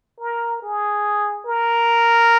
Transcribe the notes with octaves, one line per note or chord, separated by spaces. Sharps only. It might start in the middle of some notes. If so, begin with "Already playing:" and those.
A#4
G#4
A#4